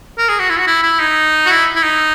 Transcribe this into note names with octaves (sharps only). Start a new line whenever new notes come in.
A#4
G#4
F#4
E4
F#4
E4
E4
D#4
F#4
E4
E4
D#4